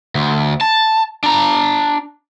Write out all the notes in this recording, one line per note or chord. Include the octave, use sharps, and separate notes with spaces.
D2
A5
D4 A#5